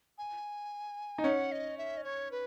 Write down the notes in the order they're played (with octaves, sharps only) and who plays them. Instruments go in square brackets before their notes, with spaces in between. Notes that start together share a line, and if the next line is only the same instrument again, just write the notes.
[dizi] G#5
[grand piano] D#4
[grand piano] C#4 [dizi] F#5
[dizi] D#5
E5
D#5
C#5
B4